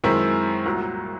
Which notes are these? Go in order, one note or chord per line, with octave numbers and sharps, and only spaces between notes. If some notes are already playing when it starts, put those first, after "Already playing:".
F#2 D#3 G#3 C4 E4
C2 A#2 F#3